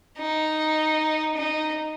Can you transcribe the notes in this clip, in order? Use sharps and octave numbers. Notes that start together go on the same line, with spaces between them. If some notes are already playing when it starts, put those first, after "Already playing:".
D#4
D#4